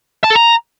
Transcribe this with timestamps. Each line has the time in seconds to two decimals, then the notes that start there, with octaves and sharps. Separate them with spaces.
0.24 A5
0.30 A4
0.36 A#5